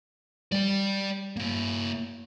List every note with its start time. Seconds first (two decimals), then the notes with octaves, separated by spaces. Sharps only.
0.52 G3 D5 G5
1.37 A#3 E4